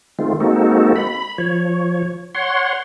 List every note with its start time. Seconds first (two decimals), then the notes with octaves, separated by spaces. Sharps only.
0.19 D#3 G#3 A3 C4 F4
0.40 G#3 A#3 C4 D#4 F#4 A4
0.96 B5
1.38 F3 C#5
2.35 C#5 F#5 C6